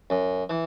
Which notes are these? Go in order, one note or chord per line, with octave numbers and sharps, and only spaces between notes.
F#2
E3